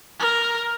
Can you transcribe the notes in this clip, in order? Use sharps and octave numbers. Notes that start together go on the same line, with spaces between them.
A#4